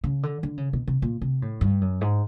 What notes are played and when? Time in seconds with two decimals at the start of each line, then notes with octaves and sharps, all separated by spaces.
0.04 C#3
0.23 D3
0.43 D3
0.57 C#3
0.73 B2
0.87 C3
1.02 A#2
1.21 C3
1.42 A2
1.61 G2
1.81 F#2
2.01 G#2